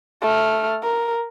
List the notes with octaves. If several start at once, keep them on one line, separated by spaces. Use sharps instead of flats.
A3 F6
A#4